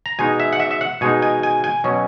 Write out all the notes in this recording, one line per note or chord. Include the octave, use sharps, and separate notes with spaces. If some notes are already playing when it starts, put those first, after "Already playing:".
A#5
B2 G#3 D#4 G#5
E5
F#5
E5
E5
F#5
B2 G#3 D#4 G#5
G#5
G#5
G#5
B2 F#3 C#4